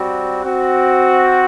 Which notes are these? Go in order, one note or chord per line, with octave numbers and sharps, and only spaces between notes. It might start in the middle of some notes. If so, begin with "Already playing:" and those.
Already playing: G3 C4 F#4
C4 F#4